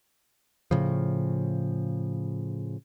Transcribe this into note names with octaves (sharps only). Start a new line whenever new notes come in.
A2 C#3 F3